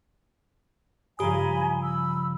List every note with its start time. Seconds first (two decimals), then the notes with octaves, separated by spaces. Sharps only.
1.19 G2 C#3 F3 G4 G#5 A#5 B5 D#6
1.82 B5 E6